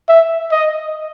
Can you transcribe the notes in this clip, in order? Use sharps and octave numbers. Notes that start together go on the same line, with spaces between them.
E5
D#5